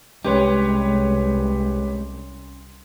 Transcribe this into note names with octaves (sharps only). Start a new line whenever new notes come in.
C2 G#3 C#4 G4 B4 C#5 C6